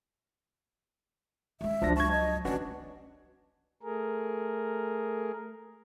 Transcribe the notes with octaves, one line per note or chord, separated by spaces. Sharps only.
G#3 C#4 E5
C#2 F3 F#3 D4 A#6
A5 C#6 G#6
D#5
E3 B3 C#4 D4 F#4 B4
A3 G#4 A#4